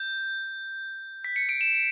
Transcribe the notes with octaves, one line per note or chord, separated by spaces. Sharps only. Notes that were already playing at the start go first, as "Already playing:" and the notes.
Already playing: G6
B6
C#7
D7
E7
D7